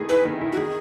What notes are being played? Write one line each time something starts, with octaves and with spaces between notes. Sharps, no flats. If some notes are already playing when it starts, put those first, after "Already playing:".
Already playing: D#3 E3 A3 G#4
E4 B4
D#3
E4
F#4
D#3 G#4